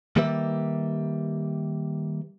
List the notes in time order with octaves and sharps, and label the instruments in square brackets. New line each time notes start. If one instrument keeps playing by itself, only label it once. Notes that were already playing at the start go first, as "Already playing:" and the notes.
[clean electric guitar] D#3 G3 A#3 G4 B4 E5